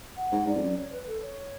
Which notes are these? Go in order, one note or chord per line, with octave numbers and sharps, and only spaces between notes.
F#5
G#2
G#2 D5
F2
F#2
C#5
B4
A4
C#5